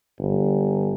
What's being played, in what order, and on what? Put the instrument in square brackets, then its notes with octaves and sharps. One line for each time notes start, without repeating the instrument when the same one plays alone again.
[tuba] G1